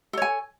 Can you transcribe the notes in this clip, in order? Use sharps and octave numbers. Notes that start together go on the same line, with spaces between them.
A4 C#5 G#5